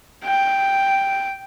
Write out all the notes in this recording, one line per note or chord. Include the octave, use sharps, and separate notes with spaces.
G5